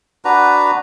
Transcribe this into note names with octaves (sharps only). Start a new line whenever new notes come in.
D4 F#4 B4 A#5